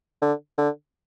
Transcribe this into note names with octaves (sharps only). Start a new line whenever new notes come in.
D3
D3